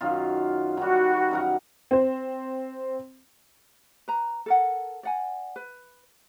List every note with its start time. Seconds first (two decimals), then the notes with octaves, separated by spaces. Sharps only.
0.01 F#2 D#3 F4
0.77 D#3 G3 F#4
1.31 F#2 A#4 F#5
1.91 C4 C5
4.08 B4 A#5
4.46 A4 A#4 F#5
5.03 D5 F#5 G#5
5.56 B4